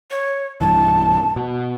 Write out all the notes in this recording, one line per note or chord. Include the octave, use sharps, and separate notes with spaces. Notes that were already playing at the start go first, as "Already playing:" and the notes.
C#5
B1 G2 E3 A5
B2